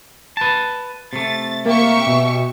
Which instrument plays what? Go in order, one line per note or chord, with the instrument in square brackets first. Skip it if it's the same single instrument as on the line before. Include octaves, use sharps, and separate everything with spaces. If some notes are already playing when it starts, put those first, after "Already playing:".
[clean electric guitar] B4 A5
[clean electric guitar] C3 A3 [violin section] A6
[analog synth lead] A#3 [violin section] G4 E5 C#6
[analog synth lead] B2